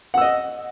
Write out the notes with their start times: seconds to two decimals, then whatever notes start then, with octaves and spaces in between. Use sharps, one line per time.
0.14 F#5
0.18 E6
0.21 D#5